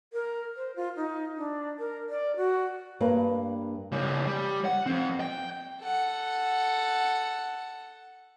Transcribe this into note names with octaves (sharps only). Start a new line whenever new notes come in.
A#4
C5
F4
D#4
D4
A#4
D5
F#4
G2 A#3 B4
C#3 G3
G3
F#5
F3 C4
G5
A4 F#5